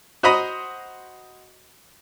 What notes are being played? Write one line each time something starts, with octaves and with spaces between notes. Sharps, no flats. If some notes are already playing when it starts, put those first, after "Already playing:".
F#4 C5 D#5 A#5 B5 D#6